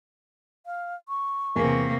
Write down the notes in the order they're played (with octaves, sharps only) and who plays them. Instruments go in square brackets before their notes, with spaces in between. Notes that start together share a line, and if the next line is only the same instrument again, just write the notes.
[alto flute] F5
C#6
[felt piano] E2 A#4 G#5 [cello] C3 A#3